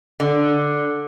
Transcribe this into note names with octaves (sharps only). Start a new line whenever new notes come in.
D3